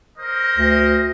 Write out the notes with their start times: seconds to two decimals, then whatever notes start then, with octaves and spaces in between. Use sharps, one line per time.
0.17 A#4 C5 D#5
0.58 D2